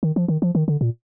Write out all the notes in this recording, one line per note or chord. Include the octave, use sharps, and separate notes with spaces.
D#3
F3
D#3
F3
D#3
D3
A#2